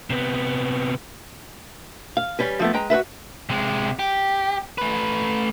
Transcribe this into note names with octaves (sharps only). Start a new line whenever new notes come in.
C3 B3
F5
G3 C#4 B4
F3 A3 B3
G#3 B4 G5 A#5
F#4 A4 B4 E5
C3 G#3
G4
A3 B4